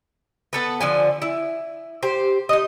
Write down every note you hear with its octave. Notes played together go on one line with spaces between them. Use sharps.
B3 A4 B4
D3 F3 G#5
E4
G4 C5
D#4 D#5